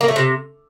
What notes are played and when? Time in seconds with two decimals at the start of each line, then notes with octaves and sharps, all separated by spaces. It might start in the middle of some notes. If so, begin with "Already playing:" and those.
0.01 A#3
0.08 A3
0.16 C3